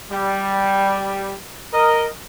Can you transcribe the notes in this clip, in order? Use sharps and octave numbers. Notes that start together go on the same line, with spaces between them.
G3
A#4 D#5